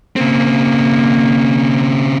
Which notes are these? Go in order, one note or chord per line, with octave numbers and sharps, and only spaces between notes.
C#3 A#3 C4